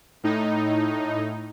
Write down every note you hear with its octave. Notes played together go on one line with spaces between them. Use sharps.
A2 D#4